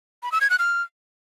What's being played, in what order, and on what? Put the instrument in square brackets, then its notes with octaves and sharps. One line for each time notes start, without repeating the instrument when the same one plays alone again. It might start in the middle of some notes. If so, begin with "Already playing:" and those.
[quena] B5
E6
G#6
F#6
F6